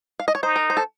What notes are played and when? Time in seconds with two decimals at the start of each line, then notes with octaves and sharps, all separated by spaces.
0.20 F5
0.28 D#5
0.35 C#5
0.43 D#4 C5
0.56 A#4
0.70 C5
0.77 A4